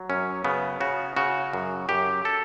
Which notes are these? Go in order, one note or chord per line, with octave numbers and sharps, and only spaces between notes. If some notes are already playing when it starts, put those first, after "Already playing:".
Already playing: F#3
F#2 C#4
C#3 B3
C#3 F#4
C#3 F#4
F#2
F#2 G4
A4